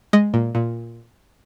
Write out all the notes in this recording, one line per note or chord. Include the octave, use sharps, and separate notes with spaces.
G#3 D#5
A#2
A#2